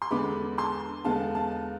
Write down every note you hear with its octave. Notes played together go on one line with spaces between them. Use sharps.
C6
E2 D3 G#3 B3 B5 D6
A5 C6
E2 D3 G#3 B3 F5 A5
F5 A5